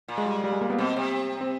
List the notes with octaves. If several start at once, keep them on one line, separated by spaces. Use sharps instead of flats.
A#2
G#3
G3
G3
G#3
A#3
B3
B2 C4
C3
C4